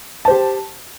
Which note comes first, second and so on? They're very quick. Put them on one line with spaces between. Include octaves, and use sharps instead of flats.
A5 C5 G4